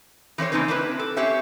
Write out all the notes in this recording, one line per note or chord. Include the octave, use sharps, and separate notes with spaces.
E3 C4 C5 C#5
C#3 A#3 C4 C#4 D#4 B4
C4 D4 E4 G4 A#4 B4
A4
C4 C#4 G4 C#5 E5